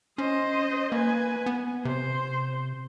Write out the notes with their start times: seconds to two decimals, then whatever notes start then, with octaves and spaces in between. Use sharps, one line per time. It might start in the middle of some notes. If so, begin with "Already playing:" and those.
0.18 C#4 C5 D#5
0.92 A#3 B4 G#5
1.46 B3
1.85 C3 C5